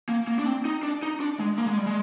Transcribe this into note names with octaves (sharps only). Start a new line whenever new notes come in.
A#3
A#3
D4
C4
D#4
D4
D#4
D4
G#3
A#3
G#3
G3
G#3